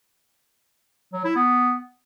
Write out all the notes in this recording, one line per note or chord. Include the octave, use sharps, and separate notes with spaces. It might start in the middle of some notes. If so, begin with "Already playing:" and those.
F#3
E4
B3